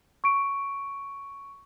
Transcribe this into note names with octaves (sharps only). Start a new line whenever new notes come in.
C#6 D7